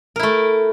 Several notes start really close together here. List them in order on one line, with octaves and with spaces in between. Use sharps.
A#4 E4 A3